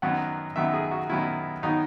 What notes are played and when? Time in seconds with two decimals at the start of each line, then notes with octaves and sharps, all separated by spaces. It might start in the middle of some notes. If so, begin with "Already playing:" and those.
0.02 F#2 D#3 F#3 B3 F#5
0.56 F#2 D#3 F#3 B3 E5
0.73 G#4
0.91 F#4
1.10 F#2 D#3 F#3 B3 E4
1.63 D#3 F#3 B3 D#4